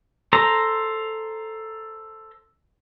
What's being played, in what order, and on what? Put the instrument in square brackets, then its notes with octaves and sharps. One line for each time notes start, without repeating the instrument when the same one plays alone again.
[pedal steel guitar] A4 C5 A#5